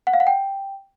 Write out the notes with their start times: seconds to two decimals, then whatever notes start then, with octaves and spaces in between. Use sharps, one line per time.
0.07 F#5
0.13 F5
0.20 F#5
0.27 G5